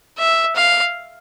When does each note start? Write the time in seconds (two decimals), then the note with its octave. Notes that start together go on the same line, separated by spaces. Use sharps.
0.18 E5
0.55 F5